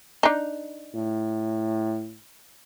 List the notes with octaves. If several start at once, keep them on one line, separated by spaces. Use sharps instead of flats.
D4 D#4
A2